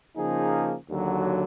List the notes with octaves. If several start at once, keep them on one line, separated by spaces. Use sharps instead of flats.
C#3 F3 A#3 D#4 G#4
D#2 D3 F#3